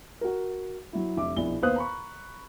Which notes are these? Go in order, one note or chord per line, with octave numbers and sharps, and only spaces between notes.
F#4 A#4
F#3 E4
F1 D3 E5 D6
A#1 B2 E4 G7
D#2 B3 C5 F5 D#6 F#6
A#5 B5 C#6